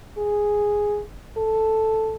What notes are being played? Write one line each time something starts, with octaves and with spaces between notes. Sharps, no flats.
G#4
A4